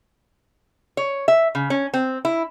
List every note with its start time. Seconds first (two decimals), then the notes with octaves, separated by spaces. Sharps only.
0.97 C#5
1.28 E5
1.55 C#3
1.70 C#4
1.94 C4
2.25 E4